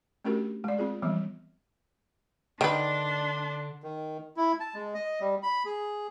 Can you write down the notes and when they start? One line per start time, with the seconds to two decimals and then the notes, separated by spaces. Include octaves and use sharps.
0.25 A3 C#4 D4 F#4 G4 A#4
0.64 G#3 D5
0.78 C4 F4 G#4
1.02 E3 F3 G3 B3 C4
2.61 D3 D#3 D4 B4 C6
3.83 D#3
4.37 E4
4.60 A5
4.75 G#3
4.94 D#5
5.21 G3
5.43 B5
5.66 G#4